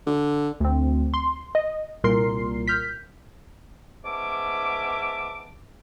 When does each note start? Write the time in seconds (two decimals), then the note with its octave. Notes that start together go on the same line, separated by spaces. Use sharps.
0.07 D3
0.60 D2 C4
1.14 C6
1.55 D#5
2.04 C2 A#2 A#4 C6 C7
2.67 F6 G6 B6
4.05 G#2 B3 C#4 E5 A5 D6